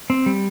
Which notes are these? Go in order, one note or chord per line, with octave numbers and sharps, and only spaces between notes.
C4
G3